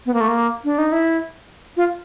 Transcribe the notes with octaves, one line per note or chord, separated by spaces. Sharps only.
B3
A#3
A3
A#3
D4
D#4
E4
F4